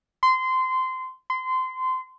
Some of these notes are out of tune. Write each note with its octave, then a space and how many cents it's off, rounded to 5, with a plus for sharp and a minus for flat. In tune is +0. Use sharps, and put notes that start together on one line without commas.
C6 -20
C6 -25